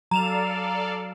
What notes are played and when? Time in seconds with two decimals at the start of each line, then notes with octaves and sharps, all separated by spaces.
0.11 F#3 A4 D5 F5 A#5 E7 F7